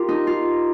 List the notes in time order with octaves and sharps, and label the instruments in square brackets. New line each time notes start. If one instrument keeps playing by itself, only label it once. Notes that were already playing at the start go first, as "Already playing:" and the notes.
Already playing: [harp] F4 G4 A#4
D#4
F4